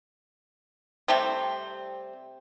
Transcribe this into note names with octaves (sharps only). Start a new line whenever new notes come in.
C3 G3 A3 C4